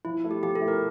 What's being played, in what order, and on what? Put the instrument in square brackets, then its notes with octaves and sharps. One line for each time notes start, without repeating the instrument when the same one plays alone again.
[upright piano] F3 [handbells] E4
[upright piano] A3 E4
[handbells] G4
[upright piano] F3 [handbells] G4
[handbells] A4
[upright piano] A3 E4
[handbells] A#4